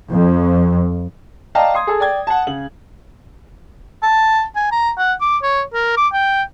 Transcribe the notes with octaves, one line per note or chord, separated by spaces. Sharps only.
F2
D5 D#5 F5 G5 A5 A#5
C6 D#6 G#6
G#4 A4
D5 G5 G#6
F#5 A5
C#3 F#7
A5
G#5
A#5
F#5
D6
C#5
A#4
D6
G5